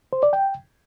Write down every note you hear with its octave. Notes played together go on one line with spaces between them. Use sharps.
C5
D5
G5